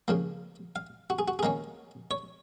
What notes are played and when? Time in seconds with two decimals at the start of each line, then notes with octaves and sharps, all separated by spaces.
0.08 C#3 F3 A#3
0.76 F5
1.10 F#4
1.19 G#4
1.28 F#4
1.39 G#4
1.43 D#3 A#3 C#4 A#4
2.11 C#5